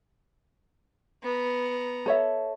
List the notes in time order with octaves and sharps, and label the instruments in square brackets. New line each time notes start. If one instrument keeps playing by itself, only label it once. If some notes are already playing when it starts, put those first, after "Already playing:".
[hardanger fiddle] B3 A#5
[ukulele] A4 C#5 E5